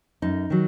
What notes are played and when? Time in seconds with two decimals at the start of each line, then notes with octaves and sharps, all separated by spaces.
0.22 F#2 D#4
0.50 D#3 F#3